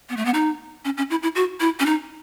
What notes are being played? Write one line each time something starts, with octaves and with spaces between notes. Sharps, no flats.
B3
A3
B3
D#4
C#4
C#4
E4
E4
F#4
E4
C#4
D#4